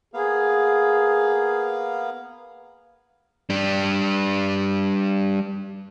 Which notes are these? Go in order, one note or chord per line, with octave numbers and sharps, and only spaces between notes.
A#3 B3 G#4 F5
G3 D4